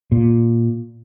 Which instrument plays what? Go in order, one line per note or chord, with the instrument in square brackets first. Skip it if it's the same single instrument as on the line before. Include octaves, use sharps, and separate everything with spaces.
[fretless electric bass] A#2